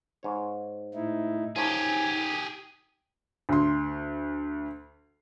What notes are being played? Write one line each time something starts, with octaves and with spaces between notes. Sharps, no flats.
G#2 C#5
A2 D#4 E4
F3 A#3 C#4 D#4 G4 G#4 G#5
D2 C6